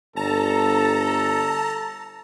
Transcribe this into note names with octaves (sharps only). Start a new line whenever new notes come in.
G1 A4 A5 A#5